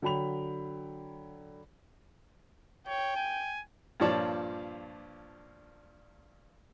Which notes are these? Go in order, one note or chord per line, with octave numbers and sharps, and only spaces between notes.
D3 F#3 G5 B5 F7
C#5 G5
G#5
G2 A#2 F3 C#5 D5 A5